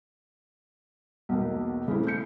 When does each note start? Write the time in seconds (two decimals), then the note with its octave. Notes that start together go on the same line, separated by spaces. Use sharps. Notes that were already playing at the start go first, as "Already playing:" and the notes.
1.29 B1 E2 A#3
1.88 C#3 A3 C4 E4
2.07 G6 C#7